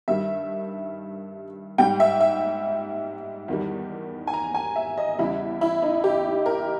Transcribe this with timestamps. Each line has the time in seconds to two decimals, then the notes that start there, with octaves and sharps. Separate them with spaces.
0.08 G2 D#3 G3 E5
1.78 G#2 G3 G5
2.00 E5
2.20 E5
3.48 E2 D#3 G3
4.27 G#5
4.34 A#5
4.54 G#5
4.76 E5
4.98 D#5
5.18 E2 C#3 G3 E4
5.61 E4
5.82 D#4
6.04 G4
6.46 A#4